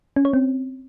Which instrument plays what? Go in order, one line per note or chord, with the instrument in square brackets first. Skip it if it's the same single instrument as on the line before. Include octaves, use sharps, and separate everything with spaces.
[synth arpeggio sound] C#4
C#5
C4